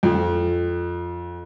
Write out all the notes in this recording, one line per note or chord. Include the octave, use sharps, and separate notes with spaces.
F2